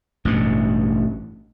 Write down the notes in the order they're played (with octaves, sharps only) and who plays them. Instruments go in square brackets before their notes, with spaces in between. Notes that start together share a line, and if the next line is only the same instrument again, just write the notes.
[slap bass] A1 G2 B2